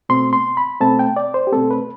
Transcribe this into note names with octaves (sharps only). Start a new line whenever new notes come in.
B2 A3 C4 C6
C6
B5
B2 A3 C4 A5
G5
D5
C5
G4
B2 A3 C4 A4
B4